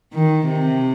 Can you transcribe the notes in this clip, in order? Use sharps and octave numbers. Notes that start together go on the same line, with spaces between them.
D#3
C3